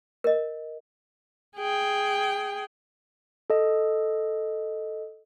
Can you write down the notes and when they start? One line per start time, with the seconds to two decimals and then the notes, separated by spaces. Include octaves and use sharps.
0.24 A#4 D#5
1.57 G#4 G5
3.50 A4 D#5